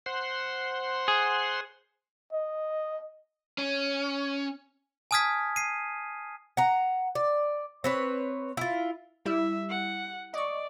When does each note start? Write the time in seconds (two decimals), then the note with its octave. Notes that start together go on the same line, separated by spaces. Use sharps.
0.06 C5 F#5 C6
1.08 G#4
2.33 D#5
3.58 C#4
5.11 G#5 A5 D#6 F6 G#6 B6
5.56 C7 D#7
6.57 F#5 A#5
7.15 D5
7.84 C4 B4 C#5
8.57 E4 F4
9.26 G3 E4 E5
9.69 F#5
10.34 D5 D#5 C#6